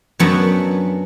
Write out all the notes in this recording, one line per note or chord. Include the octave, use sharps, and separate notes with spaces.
F#2 F#3 B3 D4 F#4